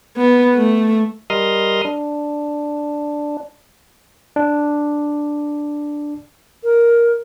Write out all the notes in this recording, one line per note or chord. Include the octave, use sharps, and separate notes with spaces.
B3
A3
G3 A#4 D#5 C6 D#6 F6
D4
D4
A#4